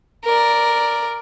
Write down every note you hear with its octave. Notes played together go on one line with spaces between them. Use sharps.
A#4 D5